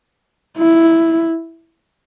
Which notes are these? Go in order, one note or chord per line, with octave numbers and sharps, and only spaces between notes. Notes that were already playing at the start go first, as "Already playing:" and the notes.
E4